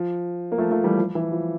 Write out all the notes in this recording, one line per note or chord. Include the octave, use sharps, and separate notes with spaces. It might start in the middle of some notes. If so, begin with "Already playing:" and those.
Already playing: F3
A#3
F3 A3
F3 A3
E3 G3
F3
E3
F3